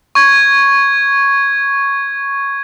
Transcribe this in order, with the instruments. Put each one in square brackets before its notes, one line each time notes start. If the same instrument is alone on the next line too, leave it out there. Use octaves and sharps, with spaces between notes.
[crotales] C#6 G#6